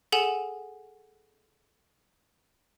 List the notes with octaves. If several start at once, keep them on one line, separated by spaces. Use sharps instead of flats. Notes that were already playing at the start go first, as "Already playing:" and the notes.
G#4 A4 F#5 G#5 D#7 E7